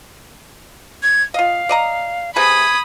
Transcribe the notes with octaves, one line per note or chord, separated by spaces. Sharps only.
G#6
F4 D#5 F5
D5 D#5 A#5
C3 G#4 B4 B5 D#6 G#6